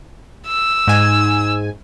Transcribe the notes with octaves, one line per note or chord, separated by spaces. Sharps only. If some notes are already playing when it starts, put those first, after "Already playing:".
E6
G#2 G#5